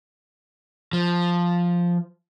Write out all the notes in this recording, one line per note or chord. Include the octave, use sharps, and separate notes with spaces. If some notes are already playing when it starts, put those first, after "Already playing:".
F3